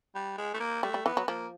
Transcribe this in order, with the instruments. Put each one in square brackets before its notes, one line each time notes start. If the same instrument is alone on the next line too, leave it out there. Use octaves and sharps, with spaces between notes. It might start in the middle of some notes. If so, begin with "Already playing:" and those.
[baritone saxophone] G3
G#3
A3
A#3
[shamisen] G3 [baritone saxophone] A3
[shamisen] G3
[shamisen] E3 [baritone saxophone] B3
[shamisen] F#3
[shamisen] F3 [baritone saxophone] A#3